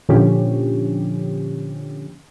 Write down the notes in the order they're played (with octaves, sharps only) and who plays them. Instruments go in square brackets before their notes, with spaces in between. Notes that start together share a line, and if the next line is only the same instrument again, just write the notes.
[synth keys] A#2 D3 F3 C#4 G4